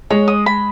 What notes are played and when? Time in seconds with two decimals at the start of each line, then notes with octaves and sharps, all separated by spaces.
0.10 G#3 C#5
0.28 D#6
0.46 B5